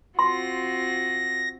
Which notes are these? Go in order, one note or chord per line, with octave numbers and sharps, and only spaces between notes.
C4 F4 F#4 C6 A#6